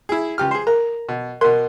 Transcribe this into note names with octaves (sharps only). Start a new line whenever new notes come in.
E4 G#4
C#2 G4 F6
G#4 C5
A#4 A#5
B2
B2 A#4 C6